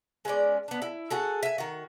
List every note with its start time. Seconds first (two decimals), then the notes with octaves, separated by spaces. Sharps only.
0.25 G#3 B3 C#4 D5
0.68 B3 D4
0.82 E4
1.10 F#4 G#4 A4
1.43 E5 G#5
1.58 D#3 F#4